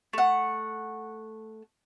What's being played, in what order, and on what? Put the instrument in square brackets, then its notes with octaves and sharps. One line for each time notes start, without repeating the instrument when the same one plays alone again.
[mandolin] A3 F#5